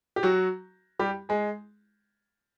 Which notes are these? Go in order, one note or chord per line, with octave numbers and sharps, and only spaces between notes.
G4
F#3 F#4
G3 G4
G#3 G#4